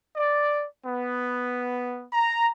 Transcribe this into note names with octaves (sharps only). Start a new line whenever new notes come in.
D5
B3
A#5